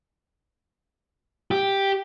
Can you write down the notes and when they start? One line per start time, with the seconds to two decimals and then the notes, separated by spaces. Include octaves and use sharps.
1.51 G4